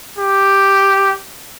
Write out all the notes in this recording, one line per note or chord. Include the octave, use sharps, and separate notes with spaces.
G4